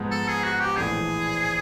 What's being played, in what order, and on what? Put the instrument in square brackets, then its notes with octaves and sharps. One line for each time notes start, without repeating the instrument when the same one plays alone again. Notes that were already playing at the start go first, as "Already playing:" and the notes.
Already playing: [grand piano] G#2 F3 G#3 B3
[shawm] A4
G#4
F#4
G4
[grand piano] A#1 A2 E3 A3 [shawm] G#4